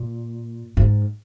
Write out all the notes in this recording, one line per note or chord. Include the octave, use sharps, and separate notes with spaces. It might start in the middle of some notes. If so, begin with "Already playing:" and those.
Already playing: A#2
G#2